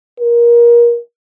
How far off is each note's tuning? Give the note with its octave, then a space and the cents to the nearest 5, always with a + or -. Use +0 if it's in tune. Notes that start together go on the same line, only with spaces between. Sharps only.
A#4 +25